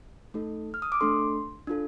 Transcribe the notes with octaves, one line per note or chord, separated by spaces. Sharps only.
A3 D#4 A4
F6
D#6
D6
A3 D4 A4 C6
D4 F4 A4